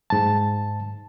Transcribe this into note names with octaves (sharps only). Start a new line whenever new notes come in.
G#2 A5